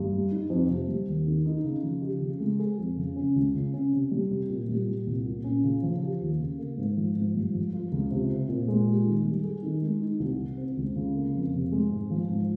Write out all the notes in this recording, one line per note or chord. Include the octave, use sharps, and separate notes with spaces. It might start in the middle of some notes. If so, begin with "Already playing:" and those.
Already playing: G2
G3
D#4
F2
C3
G3
D#2
D#3
D#4
C#3
F3
G4
C#3
G#3
G#4
F2
C#3
C#4
C#2
C#3
C#4
C3
G3
C3
A#2
G3
A#2
C2
A#2
C#4
C#3
F3
G4
D#2
C#3
A#3
G#2
F3
G#2
G2
F3
F4
C#2
C3
C4
A#2
G#3
G4
D#3
G3
G#4
D#3
G#3
D#4
C2
C3
C4
C#2
C#3
A#3
F2
C3
G#3
G#2
F3
G#2